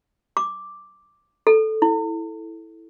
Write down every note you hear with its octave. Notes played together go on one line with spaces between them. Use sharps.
D6
A4
E4